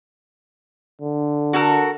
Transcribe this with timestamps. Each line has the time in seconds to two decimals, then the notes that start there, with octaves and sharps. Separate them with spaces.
1.02 D3
1.53 F#4 A4 A#4